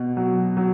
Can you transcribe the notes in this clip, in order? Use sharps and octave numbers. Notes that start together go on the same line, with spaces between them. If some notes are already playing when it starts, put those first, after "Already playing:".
Already playing: B2
F#3
F#3